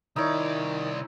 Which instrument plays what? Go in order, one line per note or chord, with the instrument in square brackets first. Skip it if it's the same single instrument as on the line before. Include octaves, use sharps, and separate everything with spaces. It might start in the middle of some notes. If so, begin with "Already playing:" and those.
[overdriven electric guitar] C2 D5 [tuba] D#3 [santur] D#4 E4 C#5